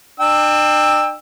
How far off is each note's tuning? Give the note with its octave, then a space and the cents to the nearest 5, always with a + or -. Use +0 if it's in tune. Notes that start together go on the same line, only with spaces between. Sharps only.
D4 +45 G5 +25 E6 +0